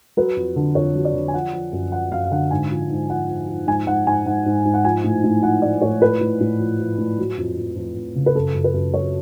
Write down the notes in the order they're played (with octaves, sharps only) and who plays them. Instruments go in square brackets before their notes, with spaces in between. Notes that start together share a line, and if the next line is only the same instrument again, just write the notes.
[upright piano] F#3 B4
F2
D3
F2 C#5
F#3
D5
D3
G#5
F3 F#5
F3
F#2
F3 F#5
F#2 F5
F5
D3 F#5
G#2 G#5
F3
G#2
F3 F#5
F3
F3
G#2 G#5
G#2 F#5
G#2 G#5
G#2 F#5
G#2
G#2
F#5
F3 G#5
A2
A2
F3 F#5
F3 D5
A2 C#5
F3 B4
A2
A2
F3
F3
A2
F#3
F2
F2
F2
F2
C#3
B4
F#2 A4
F#2
B4
F#2
F#3 C#5